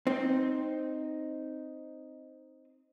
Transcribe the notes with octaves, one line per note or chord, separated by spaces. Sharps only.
C4 D#4